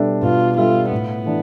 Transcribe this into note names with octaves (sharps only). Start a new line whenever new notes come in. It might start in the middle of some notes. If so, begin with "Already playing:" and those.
Already playing: B2 G3 D4 A4 E5
B2 F4
G3 D4 F4 A4 E5
A2 B3
E3 A3 D4